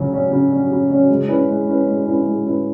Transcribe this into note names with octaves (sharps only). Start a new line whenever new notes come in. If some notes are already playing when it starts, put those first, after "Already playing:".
Already playing: C#3 F#3 C#4
F#3 C#4
C#3
F#3 C#4
C#3
F#3 C#4
G#3
C#4 E4 B4
G#3
C#4 E4 B4
G#3
C#4 E4 B4
G#3
C#4 E4 B4